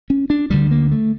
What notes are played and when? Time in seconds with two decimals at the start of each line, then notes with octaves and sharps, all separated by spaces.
0.10 C#4
0.30 D4
0.50 D2 D3 G3
0.71 A#3
0.91 A3